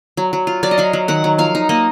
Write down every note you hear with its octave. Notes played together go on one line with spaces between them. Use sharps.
F#3
F#3
F4
F#3 D5
D#5
F#3 F5
F#3
D#3 F#5
F#3
F3 F5
D#4
A#3 D#5